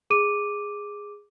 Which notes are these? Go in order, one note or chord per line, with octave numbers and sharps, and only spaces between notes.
G#4 D6 D#7